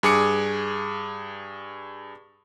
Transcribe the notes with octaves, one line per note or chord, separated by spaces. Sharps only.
G2 G#4 D6 C#7